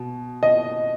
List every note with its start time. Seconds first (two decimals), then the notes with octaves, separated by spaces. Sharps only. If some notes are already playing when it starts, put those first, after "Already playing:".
Already playing: B2
0.43 D#5